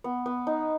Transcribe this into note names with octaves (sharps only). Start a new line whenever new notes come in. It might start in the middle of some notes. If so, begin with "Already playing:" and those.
B3
B3
D#4